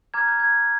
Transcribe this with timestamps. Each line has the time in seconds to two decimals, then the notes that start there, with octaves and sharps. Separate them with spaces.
0.14 A#5 D6 F6 G#6
0.28 G6
0.40 G#6